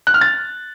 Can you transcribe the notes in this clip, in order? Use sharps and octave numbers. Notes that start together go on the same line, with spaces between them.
F#6
F6
A6